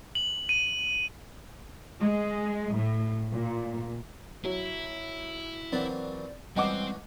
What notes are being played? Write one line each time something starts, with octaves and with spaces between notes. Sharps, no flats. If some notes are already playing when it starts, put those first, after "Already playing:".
F#7
D#7
G#3
A2
A#2
F#3 E4
E3 F#3 A#3 C4 D5
G#2 E3 G3 C4 C#4 D#5 F#5 D6